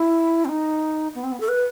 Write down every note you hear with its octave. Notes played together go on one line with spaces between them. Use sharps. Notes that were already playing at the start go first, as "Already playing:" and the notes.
Already playing: E4
C4
D#4
B3
C4
B3
A4
B4